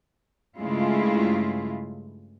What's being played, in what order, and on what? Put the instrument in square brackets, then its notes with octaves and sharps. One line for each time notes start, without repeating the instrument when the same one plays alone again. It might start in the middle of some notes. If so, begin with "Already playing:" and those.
[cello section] G2 C#3 G#3 A3 E4 F4